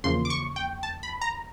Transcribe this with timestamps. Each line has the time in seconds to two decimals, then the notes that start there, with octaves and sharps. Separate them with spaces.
0.04 E2 C#3 F3 A#3 C6
0.25 D6
0.30 C#6
0.56 G5
0.83 A5
1.03 B5
1.22 A#5